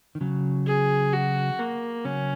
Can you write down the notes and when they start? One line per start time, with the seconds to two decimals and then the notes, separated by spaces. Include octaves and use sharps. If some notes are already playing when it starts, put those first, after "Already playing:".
0.15 D#3
0.21 C#3 F#3
0.67 G#4
1.13 F#4
1.59 A#3
2.05 C#3 F#3 C#4